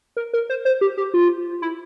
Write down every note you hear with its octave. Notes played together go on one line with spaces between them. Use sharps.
A#4
A#4
C5
C5
G4
G4
F4
E4